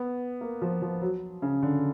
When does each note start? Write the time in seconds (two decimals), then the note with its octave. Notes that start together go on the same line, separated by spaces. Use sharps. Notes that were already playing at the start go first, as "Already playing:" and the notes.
Already playing: B3
0.41 A#3
0.62 F3
0.82 F3
1.02 F#3
1.42 C#3
1.62 D3